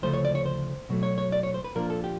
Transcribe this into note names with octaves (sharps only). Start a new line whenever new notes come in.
D2 C#3 F3 A3 C5
C#5
D5
C#5
C5
B2 F#3 A3
C#5
C#5
D5
C#5
C5
B4
A#2 F3 A#3 D4 F4 A#4
A4
G4